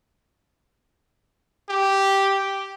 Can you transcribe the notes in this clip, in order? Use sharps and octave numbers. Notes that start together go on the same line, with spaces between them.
G4